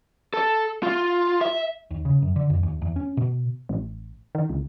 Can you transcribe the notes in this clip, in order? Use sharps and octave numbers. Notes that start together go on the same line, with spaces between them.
A4
F4
E5
D#2
C#3
F#2
D3
F2
D#2
E2
C#4
B2
A1
D#3
C#2